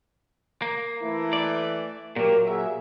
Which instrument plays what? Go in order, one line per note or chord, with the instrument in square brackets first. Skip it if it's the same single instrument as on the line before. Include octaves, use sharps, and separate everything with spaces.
[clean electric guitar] A#3
[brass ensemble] E3 A3 E4
[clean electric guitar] D5
[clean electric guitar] A#2 F#3 [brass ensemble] A#3 G4 A#4
[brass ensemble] F#4 G#4 E5